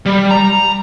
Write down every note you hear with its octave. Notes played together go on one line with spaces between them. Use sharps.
G3
A#5